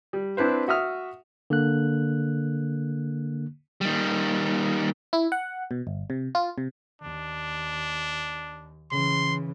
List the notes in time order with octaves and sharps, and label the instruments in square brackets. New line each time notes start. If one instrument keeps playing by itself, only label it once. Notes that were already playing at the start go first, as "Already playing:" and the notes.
[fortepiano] G3
C4 D4 E4 B4 C5
F#4 E5 D#6 F6
[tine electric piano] D3 A#3 F#6
[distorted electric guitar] D#3 G3
[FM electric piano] E4
F#5
B2
G1
C3
F4
C3
[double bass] D#2 [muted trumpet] D4
[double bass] C#3 E3 [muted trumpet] C6